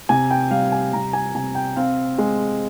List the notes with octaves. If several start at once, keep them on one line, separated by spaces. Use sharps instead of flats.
C3 G#5
G5
G3 F5
G#5
C3 A#5
G#5
C3 G#5
G5
C4 F5
G#3